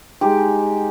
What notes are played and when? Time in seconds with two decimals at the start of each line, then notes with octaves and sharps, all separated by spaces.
0.21 G#3 D#4 G4